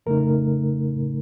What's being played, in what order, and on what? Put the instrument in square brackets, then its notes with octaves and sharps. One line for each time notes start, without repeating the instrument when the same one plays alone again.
[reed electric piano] F2 C#3 A3 D#4 A#4